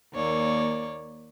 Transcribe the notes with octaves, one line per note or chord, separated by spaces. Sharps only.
D#2 A#3 C#5 D5